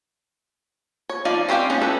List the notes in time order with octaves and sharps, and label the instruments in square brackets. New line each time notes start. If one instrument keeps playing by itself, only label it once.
[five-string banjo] C#5
F3 D#4 D5 F5
C4 C#4 G4 C5 F5
G#3 B3 C#4 D#4
E3 A4 B4 E5